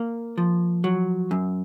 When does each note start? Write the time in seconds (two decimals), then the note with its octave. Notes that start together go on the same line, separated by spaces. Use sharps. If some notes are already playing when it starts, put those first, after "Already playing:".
Already playing: A#3
0.38 F3
0.84 F#3
1.31 F#2